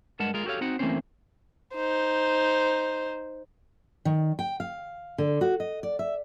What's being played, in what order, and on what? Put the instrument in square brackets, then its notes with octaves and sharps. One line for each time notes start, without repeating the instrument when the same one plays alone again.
[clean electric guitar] G2 G#3 A#4 F#5 A5
G#3 F4 A#4
F#4 G4 A4 C#5 F5
C4 D#4 F#4 F#5
E3 A3 A#3 C4 C#4 C5
[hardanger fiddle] D#4 C5
[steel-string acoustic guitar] D#3
G5
F5
D3
F#4
D#5
D5
E5